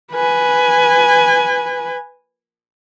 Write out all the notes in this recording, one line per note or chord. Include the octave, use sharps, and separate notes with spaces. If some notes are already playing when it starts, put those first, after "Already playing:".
B4 G#5